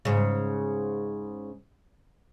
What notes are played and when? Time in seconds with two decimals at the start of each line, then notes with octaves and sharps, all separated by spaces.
0.05 G#2 C#3